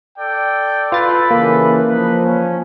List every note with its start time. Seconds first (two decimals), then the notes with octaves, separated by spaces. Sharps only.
0.19 A4 D5 G5
0.92 F4 A4 B4 A6
1.31 C#3 E3 A#3
1.90 F3 D#4 B4
2.25 C#4